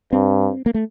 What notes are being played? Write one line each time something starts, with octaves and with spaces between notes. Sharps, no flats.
G2 C4
A#3
A3